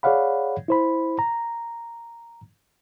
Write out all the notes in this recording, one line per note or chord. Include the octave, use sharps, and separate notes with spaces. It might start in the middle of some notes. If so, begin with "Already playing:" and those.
G#4 C#5 D5 F5 F#5 B5
E4 C5 B5
A#5